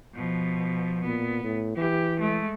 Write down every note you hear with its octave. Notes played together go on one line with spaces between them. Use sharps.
B2 F3
A#2 B3
A2
E3 G4
G#3 A3